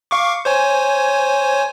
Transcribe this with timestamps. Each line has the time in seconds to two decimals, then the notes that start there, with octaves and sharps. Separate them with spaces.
0.11 F5 C#6 D6
0.45 C5 C#5 G#5